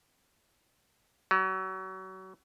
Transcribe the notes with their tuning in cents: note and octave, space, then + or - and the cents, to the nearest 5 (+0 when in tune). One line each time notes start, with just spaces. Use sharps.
F#3 +30